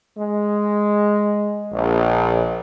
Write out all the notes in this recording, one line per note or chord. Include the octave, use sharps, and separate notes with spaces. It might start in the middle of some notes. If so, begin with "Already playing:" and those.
G#3
A#1